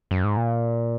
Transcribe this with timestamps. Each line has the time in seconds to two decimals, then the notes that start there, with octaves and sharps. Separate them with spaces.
0.11 F#2
0.24 G#2
0.37 A#2